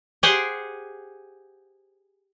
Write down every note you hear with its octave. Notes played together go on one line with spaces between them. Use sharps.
G4 G#4 C5 F#5 G5